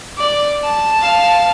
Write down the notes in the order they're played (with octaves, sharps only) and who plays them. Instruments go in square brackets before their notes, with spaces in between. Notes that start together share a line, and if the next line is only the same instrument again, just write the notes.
[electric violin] D5
A5
[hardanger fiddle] F5